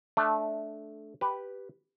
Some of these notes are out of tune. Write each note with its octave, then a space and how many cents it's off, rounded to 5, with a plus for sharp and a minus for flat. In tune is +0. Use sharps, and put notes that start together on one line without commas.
A3 -15 D4 +0
G4 +0 B4 +0